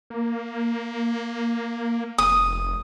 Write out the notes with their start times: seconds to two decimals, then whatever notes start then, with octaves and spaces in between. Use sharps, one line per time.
0.10 A#3
2.18 F1 D#6